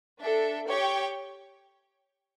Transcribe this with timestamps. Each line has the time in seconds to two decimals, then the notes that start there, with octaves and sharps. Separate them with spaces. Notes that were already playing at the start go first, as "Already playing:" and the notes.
0.21 D4 A4 E5
0.67 G4 C#5 G5